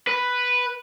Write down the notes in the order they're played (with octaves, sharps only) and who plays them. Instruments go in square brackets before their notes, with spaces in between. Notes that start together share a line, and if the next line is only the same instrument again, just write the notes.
[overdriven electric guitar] B4